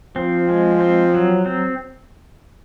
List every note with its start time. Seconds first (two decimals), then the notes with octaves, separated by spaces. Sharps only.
0.16 F3 C4
0.49 G#3
0.80 C4
1.14 F#3
1.46 C4